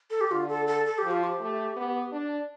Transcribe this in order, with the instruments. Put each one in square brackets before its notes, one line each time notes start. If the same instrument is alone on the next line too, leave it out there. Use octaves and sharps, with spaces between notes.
[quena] A4
G4
[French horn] D3 [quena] F4
[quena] A4
A4
A4
G4
[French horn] F3
[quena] F4
G4
[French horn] A3
B3
D4